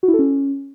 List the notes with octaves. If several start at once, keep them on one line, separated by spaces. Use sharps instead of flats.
F#4
E4
A4
C#4